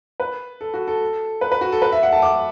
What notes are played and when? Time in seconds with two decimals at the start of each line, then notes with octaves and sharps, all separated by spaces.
0.20 B4
0.61 A4
0.74 F#4
0.88 A4
1.41 B4
1.52 B4
1.61 F#4
1.72 A4
1.82 B4
1.92 E5
2.03 F#5
2.12 A5
2.22 D6